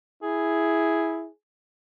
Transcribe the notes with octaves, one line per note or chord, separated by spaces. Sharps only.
E4 G#4